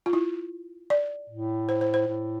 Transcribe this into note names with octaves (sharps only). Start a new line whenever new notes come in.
F4
E4
D5
A2
C5
C5
C5
A2